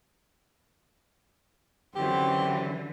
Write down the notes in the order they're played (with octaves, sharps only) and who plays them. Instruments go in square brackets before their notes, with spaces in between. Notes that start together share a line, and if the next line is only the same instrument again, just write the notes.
[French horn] F#2 [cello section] D3 E3 [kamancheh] C4 F#4 [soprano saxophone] G4